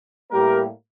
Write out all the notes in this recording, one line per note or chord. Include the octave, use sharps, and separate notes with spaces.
A2 G3 A#3 G4 A#4